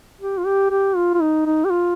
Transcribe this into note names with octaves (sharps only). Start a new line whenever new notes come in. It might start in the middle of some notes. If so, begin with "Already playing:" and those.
G4
F4
G4
G4
F4
F4
D#4
D#4
G4
F4